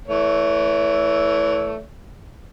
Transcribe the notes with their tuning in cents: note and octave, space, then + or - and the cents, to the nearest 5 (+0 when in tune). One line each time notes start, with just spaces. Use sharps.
E3 +0 A3 +0 C#5 +40